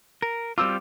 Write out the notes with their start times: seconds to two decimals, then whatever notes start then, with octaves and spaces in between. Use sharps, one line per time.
0.22 A#4
0.58 G3 C4 F4 D6 E6